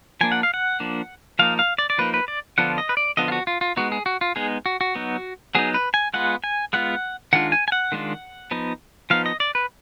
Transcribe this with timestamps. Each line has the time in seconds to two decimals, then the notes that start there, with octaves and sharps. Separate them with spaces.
0.21 F3 A#3 D4 G#5
0.32 F#5
0.43 F5
0.54 F#5
0.80 F3 A#3 D4
1.39 F3 A#3 D#4 F5
1.59 F5
1.79 D5
1.90 D5
1.98 F3 A#3 D#4 B4
2.14 B4
2.28 D5
2.58 D3 F3 B3 D4 F4 F#5
2.78 D#5
2.89 B4
2.97 D5
3.17 D3 F3 B3 D4 F4 D#5
3.28 F4
3.32 F#4
3.47 F4
3.61 F4
3.77 G#3 B3 D#4 F#4
3.92 G#4
4.06 F#4
4.21 F4
4.36 G#3 B3 D#4 G#4
4.66 F#4
4.81 F#4
4.95 F#3 B3 D#4
5.55 F#3 B3 D#4 G#4
5.74 B4
5.94 G#5
6.14 G#3 B3 F4 F#5
6.44 G#5
6.73 G#3 B3 F4 F#5
7.33 D#3 G#3 D4 F4 F#5
7.52 G#5
7.68 G#5
7.72 F#5
7.92 D#3 G#3 D4 F4
8.51 F3 B3 D#4
9.10 F3 B3 D#4 F5
9.26 D#5
9.40 D5
9.55 B4